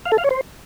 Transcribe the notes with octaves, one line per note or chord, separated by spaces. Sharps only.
F5
A4
F5
C#5
C5